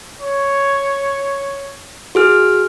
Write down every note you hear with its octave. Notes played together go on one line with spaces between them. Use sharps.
C#5
F#4 G#4 F6